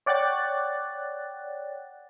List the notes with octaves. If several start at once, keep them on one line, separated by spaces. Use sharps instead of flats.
C#5 D5 F#5 G5 F#6 A6